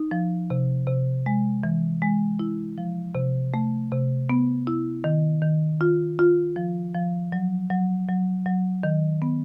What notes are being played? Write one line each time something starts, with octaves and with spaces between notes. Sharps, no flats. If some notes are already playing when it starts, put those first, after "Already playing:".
Already playing: D#4
F3
C3
C3
G#3
E3
G#3
E4
F3
C3
A3
C3
B3
E4
D#3
D#3
F4
F4
F3
F3
F#3
F#3
F#3
F#3
D#3
B3